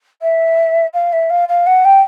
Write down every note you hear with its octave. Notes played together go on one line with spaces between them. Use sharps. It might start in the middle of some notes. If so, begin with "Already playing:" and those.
E5
F5
E5
F5
F5
F#5
G5